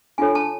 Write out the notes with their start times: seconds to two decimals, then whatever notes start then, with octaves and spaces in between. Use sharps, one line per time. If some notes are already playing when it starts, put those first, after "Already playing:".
0.18 D4 F4 A4 C#5 G#5
0.35 A5